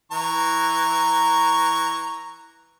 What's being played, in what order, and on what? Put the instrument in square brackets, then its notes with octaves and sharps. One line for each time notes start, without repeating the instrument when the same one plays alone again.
[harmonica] E3 A#5 C#6